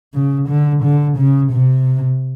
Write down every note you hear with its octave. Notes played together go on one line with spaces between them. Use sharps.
C#3
D3
D3
C#3
C3